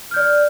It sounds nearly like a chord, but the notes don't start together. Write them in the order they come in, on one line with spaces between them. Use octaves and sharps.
F6 G6 D5